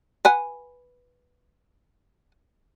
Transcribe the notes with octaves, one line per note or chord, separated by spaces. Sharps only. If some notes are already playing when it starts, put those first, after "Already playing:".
B4 F#5 G#5